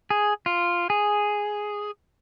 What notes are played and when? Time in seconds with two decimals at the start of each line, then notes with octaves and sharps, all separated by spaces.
0.10 G#4
0.46 F4
0.90 G#4